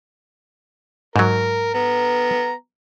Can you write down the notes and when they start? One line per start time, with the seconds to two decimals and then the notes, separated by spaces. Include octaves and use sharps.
1.16 G#2 F#3 A#4
1.74 B3 A#5